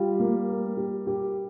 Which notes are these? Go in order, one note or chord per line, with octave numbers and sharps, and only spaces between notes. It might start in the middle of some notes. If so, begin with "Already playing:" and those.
Already playing: G3 F4
A#3
A#4
G4
G4